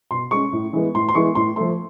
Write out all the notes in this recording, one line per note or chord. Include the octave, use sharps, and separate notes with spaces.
B2 C6
G#3 C#4 C#6
A2
E3 G#3 B3
A2 C6
C6
E3 G#3 B3 C#6
A2 C6
F3 A3 C6